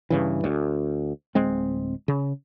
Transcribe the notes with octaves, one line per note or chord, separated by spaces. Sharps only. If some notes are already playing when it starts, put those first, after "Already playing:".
G2 C#3 E3
D2
D1 G#3 C4
C#3